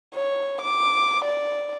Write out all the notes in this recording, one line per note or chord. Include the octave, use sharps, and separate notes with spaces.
C#5
D6
D5